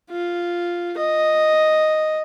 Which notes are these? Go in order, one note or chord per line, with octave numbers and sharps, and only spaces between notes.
F4
D#5